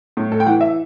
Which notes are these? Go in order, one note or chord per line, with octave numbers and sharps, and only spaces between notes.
A2
A4
G5
E3 F#5
E5